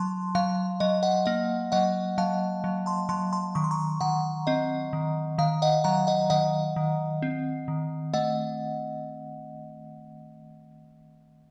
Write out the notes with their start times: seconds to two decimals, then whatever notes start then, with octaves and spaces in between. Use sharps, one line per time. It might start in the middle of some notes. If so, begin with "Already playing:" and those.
Already playing: F#3 A5 C6
0.35 F#3 F5
0.80 F#3 D#5
1.03 D#5 F#5
1.26 A#3 D#5
1.72 F#3 D#5 F#5
2.18 F#3 F5 A5
2.64 F#3
2.86 A5 C6
3.09 F#3 A5 C6
3.33 A5 C6
3.55 D#3 C#6
3.64 C6
3.71 A#5 C#6
4.01 D#3 F#5 A#5
4.47 C4 D#5
4.93 D#3
5.38 D#3 F5
5.62 D#5 F#5
5.84 F#3 F#5 A#5
6.07 D#5 F#5
6.30 D#3 D#5 F#5
6.76 D#3
7.22 C4
7.68 D#3
8.13 A3 D#5 F#5